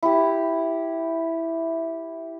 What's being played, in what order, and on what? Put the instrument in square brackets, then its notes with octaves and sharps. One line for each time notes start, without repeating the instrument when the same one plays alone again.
[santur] E4 G4